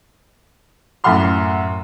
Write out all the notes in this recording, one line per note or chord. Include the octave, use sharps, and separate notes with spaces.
F#2 A2 E5 F#5 C6 F6